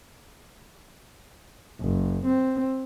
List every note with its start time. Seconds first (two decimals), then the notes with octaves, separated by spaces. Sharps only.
1.81 F#1
2.26 C4